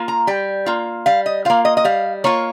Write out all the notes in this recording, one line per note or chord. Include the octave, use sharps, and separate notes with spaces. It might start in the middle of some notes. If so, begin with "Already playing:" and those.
Already playing: A#3 F4
A#5
G3 G5
A#3 F4
G3 F5
D#5
A#3 F4 F5
D#5
D#5
G3 F5
A#3 F4 C#5